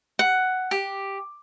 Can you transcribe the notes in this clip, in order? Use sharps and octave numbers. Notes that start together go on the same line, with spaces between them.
F#5
G4